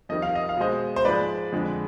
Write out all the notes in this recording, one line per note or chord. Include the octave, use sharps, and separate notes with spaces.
F2 D#3 G3 D#5
F5
D#5
F5
B2 G#3 C5 D#5
C5
G#2 F3 G#3 B4 D5
F2 D3 G#3